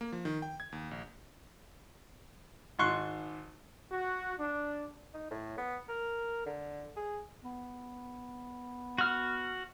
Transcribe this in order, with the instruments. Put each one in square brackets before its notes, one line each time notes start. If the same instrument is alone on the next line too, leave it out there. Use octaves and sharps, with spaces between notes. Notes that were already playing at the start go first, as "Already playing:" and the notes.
[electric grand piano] A#3
F3
D#3
G5
G#6
D#2
A#1
[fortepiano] G#1 G#2 C6 C#6 F#6
[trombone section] F#4
D4
[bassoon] D#4
A2
B3
A#4
D3
G#4
[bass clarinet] B3
[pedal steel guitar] F#4 F6